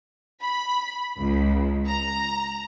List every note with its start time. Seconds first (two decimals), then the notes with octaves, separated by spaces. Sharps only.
0.43 B5
1.19 C#2
1.87 A#5